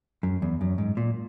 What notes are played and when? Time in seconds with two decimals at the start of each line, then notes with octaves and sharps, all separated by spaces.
0.23 F#2
0.42 E2
0.61 F#2
0.78 G#2
0.97 A#2